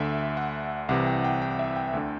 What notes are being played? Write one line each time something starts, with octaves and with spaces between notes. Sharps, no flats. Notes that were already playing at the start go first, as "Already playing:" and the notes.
Already playing: D2 D3 E5
F#5
C2 C3 E3 F#5
G5
G5
G5
E5
G5
D2 D3